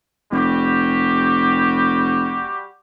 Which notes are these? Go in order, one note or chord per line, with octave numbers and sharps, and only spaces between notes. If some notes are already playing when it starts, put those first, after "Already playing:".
F1 G3 F#4 G4